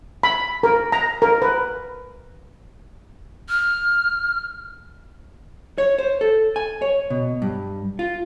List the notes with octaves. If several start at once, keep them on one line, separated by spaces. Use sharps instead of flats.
B5
A#4
A#5
A#4
B4
F6
C#5
C5
A4
G#5
C#5
B2
G2
F4